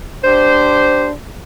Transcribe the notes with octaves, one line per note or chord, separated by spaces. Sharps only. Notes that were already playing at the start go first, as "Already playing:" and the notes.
D4 G4 C5